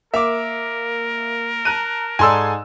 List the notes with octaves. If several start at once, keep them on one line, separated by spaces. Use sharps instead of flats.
A#3 A#4 E5 D6 F7
A5 A#5 F#6 D#7
G#2 A4 D5 G#5 C6 E6